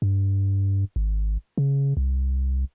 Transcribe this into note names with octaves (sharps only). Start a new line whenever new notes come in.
G2
G#1
C#3
C2